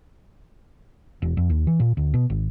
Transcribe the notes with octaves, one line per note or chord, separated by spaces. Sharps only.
E1
F2
D#2
E3
A#2
D2
B2
G#1